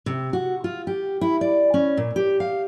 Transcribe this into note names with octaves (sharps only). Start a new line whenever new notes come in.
C3
F#4
F4
G4
E4
D5
C#4
A#2
G4
F5